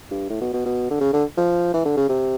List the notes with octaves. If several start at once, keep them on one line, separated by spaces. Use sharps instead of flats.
G2
A2
B2
B2
B2
D3
C#3
D3
F3
E3
D3
C#3
C3